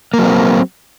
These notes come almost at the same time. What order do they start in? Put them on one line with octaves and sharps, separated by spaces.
A#3 F#3 C4